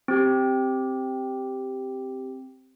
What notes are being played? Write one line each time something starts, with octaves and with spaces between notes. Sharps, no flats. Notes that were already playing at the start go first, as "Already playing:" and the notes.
C4 G4